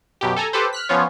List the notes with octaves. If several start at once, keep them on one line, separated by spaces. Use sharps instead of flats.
F#2 B2 G4
A4 G#5 A#5
G4 A4 B4 C5
F6 F#6 B6
F3 B3 C#4 F4 C#5